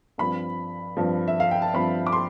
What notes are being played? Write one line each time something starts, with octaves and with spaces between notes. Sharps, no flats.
G2 F3 C4 B5
G2 F3 C4
E5
F5
G5
A5
G2 F3 C4 B5
D6
C6